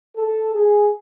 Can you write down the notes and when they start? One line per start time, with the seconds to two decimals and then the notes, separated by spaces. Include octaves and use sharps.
0.16 A4
0.54 G#4